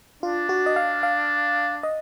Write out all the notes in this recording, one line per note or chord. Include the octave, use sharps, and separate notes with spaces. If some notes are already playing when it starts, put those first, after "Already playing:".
D4 F4
F#4
D#5
F5
F5
D#5